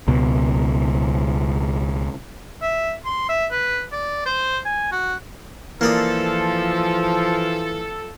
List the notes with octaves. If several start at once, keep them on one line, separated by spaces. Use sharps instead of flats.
C#2 B2
E5
C6
E5
B4
D5
C5
G#5
F#4
E3 F3 A#3 A4 D5 D#6